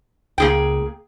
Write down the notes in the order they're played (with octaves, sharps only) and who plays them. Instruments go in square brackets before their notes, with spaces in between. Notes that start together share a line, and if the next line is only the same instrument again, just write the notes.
[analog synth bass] C#2 [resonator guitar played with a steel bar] A#3 G#4 G5